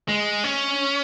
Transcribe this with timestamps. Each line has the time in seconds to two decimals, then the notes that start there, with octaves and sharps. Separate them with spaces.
0.08 G#3
0.44 C#4